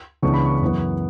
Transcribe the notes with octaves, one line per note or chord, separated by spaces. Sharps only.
C#2 C#3 E3 B3 D4 C#6
B5
C#6
F#2 E3 B3